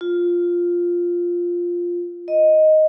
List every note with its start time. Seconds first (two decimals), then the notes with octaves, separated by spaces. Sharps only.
0.01 F4
2.28 D#5